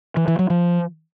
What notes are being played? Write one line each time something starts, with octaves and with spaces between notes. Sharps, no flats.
E3
E3
F#3
F3